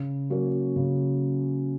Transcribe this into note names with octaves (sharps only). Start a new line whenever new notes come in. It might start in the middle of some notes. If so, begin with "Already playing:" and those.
Already playing: C#3
F#3 A#3 C#4
C#3